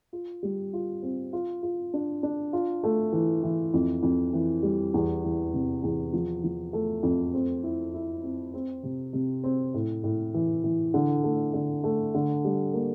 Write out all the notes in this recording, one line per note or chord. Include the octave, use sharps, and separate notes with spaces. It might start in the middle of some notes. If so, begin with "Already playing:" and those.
F4
G3
F4
C4
F4
F4
D4
D4
F4
A3
E3
E3
F2
F2
E3
G3
E2
E3
C3
E2
F3
F3
A3
F2
C4
E4
E4
C4
C4
C3
C3
C4
A2
A2
E3
E3
D3
A3
D3
A3
D3
G3
A#3